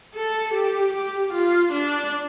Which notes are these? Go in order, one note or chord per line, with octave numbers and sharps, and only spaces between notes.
A4
G4
G4
F4
D4